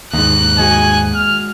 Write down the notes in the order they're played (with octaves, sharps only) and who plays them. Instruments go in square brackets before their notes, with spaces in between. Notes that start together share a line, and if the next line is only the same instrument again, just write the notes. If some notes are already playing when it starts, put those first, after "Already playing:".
[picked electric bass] D#2 G#2 [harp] D#4 [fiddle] F#6
[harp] G#3 F#4 [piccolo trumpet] G#5
[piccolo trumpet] F6